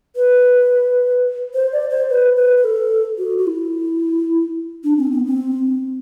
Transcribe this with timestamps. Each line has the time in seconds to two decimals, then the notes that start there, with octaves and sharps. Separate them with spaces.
0.16 B4
1.54 C5
1.73 D5
1.90 C5
2.09 B4
2.36 B4
2.57 B4
2.64 A4
3.18 F#4
3.38 F#4
3.47 E4
4.84 D4
4.98 C4
5.11 B3
5.26 C4